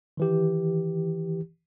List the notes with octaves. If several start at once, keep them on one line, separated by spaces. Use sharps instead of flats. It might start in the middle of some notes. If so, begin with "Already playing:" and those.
D#3 E3 G4